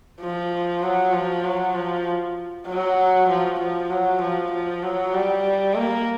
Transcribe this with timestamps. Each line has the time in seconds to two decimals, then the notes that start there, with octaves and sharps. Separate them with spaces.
0.21 F3
0.83 F#3
1.13 F3
1.45 F#3
1.75 F3
2.67 F#3
3.29 F3
3.60 F3
3.90 F#3
4.22 F3
4.52 F3
4.83 F#3
5.14 G3
5.75 A#3